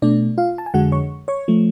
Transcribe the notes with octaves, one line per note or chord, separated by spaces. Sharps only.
B2 A3 D4 D5
F4 F5
A5
G#5
F2 D3 G#3 F#4 F#5
C#5 C#6
C#5 C#6
F3 A3